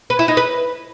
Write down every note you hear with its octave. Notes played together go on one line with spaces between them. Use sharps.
B4
E4
D#4
B4